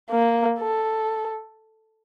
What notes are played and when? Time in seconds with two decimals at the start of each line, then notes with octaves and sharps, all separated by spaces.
0.11 A#3
0.59 A4